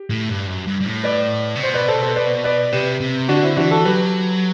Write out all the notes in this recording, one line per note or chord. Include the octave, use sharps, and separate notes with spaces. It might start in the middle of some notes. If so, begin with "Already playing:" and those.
Already playing: G4
A2
G2
F#2
G2
G2
A2
B4 D5
C3
B2 C5
B4 D5
A4 C5
A4 C5
B4 D5
B4 D5
C3 G4 B4
C3
D3 D4 F#4
C4 E4
E3 D4 F#4
F#4 A4
F#3 G4 B4